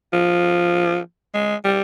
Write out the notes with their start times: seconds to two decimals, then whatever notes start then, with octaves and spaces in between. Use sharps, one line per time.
0.13 F3
1.34 G#3
1.64 G3